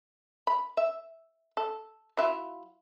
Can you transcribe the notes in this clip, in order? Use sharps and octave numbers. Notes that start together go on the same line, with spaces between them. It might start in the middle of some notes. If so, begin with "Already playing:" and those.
B5
E5
A4
F#3 E4 F4